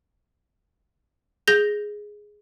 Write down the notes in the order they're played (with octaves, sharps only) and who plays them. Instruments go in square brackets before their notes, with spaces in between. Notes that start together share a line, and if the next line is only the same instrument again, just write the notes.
[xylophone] G#4 G6 A#6 G7